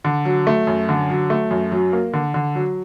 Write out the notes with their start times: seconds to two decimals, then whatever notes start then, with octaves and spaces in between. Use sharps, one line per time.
0.05 D3
0.25 F#3
0.47 A3
0.67 F#2
0.89 D3
1.10 F#3
1.30 A3
1.51 F#2
1.72 F#3
1.93 A#3
2.13 D3
2.34 D3
2.55 F#3